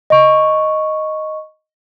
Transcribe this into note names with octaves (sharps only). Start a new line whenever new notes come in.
D#5 C#6